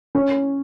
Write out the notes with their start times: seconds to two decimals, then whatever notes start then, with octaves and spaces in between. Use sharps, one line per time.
0.15 C#4